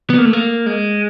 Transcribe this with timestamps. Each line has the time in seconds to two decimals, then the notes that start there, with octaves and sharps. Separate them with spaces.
0.10 B3
0.18 A#3
0.25 A3
0.33 A#3
0.66 G#3